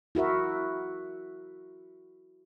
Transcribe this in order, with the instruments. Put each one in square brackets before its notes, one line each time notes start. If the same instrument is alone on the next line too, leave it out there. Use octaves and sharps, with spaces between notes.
[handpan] E4 F#4 A#4 E5